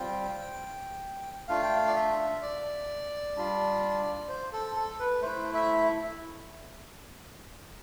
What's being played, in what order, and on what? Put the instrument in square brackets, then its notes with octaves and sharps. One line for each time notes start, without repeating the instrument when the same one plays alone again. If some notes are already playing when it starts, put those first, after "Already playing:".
Already playing: [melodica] G3 C4 F4 G5
A3 D4 F4 F5
G5
F5
D5
E5
D5
G3 D4 F4
C5
A4
A4
B4
A3 E4 C5
E5